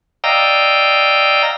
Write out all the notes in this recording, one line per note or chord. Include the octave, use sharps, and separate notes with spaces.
D5 D#5 F5 G5 A#5 E6